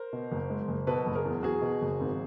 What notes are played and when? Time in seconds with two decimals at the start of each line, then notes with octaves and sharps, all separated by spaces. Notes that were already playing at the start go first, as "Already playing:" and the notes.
Already playing: A#4 C5
0.13 B2
0.31 F#1
0.50 G#3
0.68 F#1
0.87 B2 A4 B4
1.06 F#1
1.15 G#4 A#4
1.25 E2
1.43 E2 F#4 G#4
1.62 B2
1.81 F#1
2.00 G#1